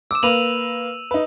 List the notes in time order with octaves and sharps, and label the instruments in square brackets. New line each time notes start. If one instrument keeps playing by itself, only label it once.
[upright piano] D6 [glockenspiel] E6 E7
[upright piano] A#3 B4 [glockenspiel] D#7 F7 F#7
[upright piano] D#4 B4